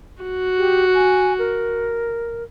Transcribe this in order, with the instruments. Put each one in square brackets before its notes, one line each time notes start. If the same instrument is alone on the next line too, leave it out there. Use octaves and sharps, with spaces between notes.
[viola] F#4
[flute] G4
G#5
A#4